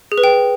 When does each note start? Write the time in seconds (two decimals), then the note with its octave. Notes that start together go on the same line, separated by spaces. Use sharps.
0.12 G#4
0.18 B4
0.24 G5